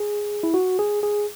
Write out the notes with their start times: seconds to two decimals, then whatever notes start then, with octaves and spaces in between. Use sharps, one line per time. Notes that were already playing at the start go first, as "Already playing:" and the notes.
Already playing: G#4
0.43 E4
0.54 F#4
0.79 G#4
1.03 G#4